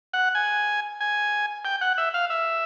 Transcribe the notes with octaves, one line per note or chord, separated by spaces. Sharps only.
F#5
G#5
G#5
G5
F#5
E5
F5
E5